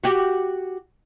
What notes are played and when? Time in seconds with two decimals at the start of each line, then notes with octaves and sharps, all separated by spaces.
0.04 F#4 G4